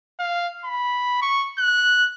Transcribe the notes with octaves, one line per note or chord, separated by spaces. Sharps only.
F5
B5
C#6
F#6